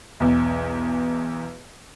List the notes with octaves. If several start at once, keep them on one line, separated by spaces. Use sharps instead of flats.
B1 E2